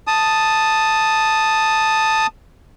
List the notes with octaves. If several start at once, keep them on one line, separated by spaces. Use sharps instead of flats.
A5 D#6